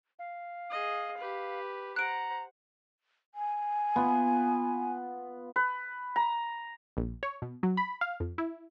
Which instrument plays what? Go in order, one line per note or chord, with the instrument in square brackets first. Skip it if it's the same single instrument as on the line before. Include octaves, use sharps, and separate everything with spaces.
[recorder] F5
[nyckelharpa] G#4 D#5
G4 B4
[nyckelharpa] C5 F#5 [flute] A#5 [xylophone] F#6 D7
[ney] G#5
[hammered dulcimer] B3 F4
B4
A#5
[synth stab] A#1
C#5
B2
F#3
B5
F5
F2
E4